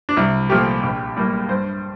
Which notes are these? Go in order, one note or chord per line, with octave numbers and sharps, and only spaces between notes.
D4
C2 E4
A#2 F3 A3 G4
A#1
A2 G3 A#3
G2 C5